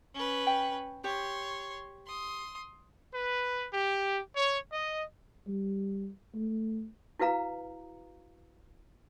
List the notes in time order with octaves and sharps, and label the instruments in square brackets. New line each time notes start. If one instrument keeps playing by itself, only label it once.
[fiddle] C#4 B4
[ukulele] G5
[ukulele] G4 [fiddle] C#5 C6
[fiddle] C6 D#6
[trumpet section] B4
G4
C#5
D#5
[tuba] G3
A3
[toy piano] E4 F#4 B4 F5 A#5